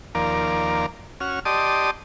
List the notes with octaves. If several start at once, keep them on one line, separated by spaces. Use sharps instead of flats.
D#2 F3 A#3 A#4 D5
C#4 F#4 F6
G4 D5 D#5 A5 C6 D#6